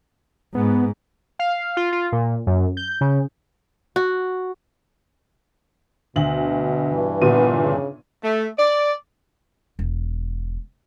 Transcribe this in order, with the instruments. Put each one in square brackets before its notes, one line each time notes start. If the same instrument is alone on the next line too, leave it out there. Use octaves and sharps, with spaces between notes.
[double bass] G#2 [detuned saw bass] B3
[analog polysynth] F5
F4
F4
A#2
F#2
G6
C#3
[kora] F#4
[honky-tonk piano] D2 F#7 [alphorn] B2
[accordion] G2 E3
[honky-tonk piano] G1 A#2 D#7 [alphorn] B3
[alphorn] C#3
[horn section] A3
D5
[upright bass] E1